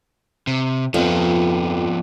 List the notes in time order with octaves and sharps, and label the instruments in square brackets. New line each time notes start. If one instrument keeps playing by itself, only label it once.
[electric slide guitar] C3
[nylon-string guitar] F2 [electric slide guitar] F3 B3